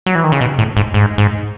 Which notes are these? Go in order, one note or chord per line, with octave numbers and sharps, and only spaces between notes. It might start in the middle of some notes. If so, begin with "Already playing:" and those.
F#3
E3
D#3
C#3
B2
A2
G#2
G#2
G#2